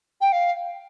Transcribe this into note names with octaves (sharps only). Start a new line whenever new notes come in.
G5
F5